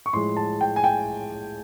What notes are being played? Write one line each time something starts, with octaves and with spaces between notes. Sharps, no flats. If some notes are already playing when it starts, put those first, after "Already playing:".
C#6
A2 F3 G#3 C6
A5
G5
G#5
G5